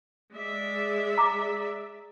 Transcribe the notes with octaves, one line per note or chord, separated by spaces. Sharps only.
G#3 D5 E5
A#5 D6